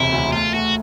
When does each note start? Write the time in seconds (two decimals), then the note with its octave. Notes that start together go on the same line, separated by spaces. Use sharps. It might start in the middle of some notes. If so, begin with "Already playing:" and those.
Already playing: E1 D2 C3 E4
0.12 D2
0.32 A3 F4
0.54 A3 F#4